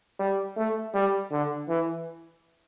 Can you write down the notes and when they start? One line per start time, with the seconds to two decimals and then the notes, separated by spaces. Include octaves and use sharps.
0.19 G3
0.57 A3
0.94 G3
1.31 D3
1.69 E3